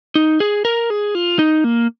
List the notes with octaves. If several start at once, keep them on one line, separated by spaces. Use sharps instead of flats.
D#4
G#4
A#4
G#4
F4
D#4
A#3